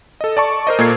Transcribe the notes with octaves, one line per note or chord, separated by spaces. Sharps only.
A4 D#5
D5 A5 C#6
A#4 C5 D#5
A#2 A#3 A4 G#6 C7